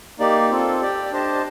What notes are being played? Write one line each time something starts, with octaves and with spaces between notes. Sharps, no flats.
A#3 D#4 G4 D5
C4 F4 A4
G4 D5 G5
D4 G4 C5 D#5 A5